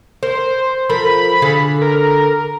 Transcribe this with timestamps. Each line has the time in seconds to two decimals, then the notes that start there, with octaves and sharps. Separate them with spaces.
0.23 A#4 C5
0.89 F3 A4 A#4 B5
1.42 D3 G#4 F5
1.82 A#4